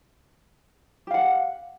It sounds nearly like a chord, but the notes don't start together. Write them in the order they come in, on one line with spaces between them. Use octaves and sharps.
G4 F5 F#5